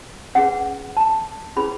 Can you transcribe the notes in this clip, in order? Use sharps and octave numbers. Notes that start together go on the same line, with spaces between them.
C#4 G#4 B4 F#5
A5
C#4 E4 G#4 B4 B5